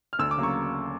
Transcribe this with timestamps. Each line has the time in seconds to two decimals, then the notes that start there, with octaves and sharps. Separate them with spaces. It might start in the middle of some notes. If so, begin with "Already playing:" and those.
0.13 F6
0.19 D2 E6
0.31 D6
0.38 C#3 F#3 A#3
0.43 C#6